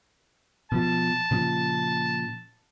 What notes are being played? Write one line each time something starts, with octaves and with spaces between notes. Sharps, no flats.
B2 F3 A5
A#2 C#3 F3